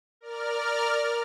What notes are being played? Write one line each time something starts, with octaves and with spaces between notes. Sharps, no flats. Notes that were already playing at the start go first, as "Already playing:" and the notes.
A#4 D5 F6